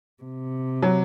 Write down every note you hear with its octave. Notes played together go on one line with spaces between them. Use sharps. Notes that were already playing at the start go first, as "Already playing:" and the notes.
C3
F#3